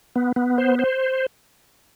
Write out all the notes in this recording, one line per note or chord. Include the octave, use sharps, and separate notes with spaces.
B3
B3
C5
C5